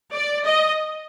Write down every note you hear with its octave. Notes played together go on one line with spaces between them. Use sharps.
D5
D#5